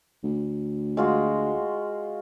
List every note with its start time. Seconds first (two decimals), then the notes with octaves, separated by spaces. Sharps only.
0.23 D2
0.97 G#3 F4 F#4